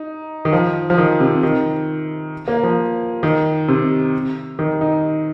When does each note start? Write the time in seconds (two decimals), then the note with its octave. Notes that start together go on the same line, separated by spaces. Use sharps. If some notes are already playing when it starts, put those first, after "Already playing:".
Already playing: D#4
0.45 D#3
0.53 F3
0.90 F3
0.98 D#3
1.20 C3
1.43 D#3
2.48 A#3
2.63 F3
3.23 D#3
3.68 C3
4.59 D#3
4.81 D#4